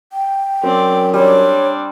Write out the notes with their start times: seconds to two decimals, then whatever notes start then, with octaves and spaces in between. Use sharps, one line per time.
0.13 G5
0.63 F#2 C4 D5
1.14 G3 C4 D4 C#5